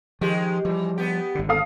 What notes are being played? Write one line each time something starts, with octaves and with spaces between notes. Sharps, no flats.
D#3 F3 G#3 G4
E3 F3 G3
B3 G4
G#1 D3
A4 F5 D#6